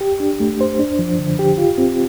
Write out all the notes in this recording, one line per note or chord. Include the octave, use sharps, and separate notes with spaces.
G4
D4
A3
C5
D4
F3
D3
G4
F4
C4